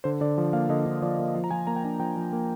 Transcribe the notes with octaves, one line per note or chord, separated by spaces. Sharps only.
D3 C5
D3 D5
F3
A#3 F5
D3 D#5
D3
F3 D5
A#3
F3 F5
A#5
F3 G#5
A#3 A#5
G5
D4 G#5
F3 G5
F3
A#3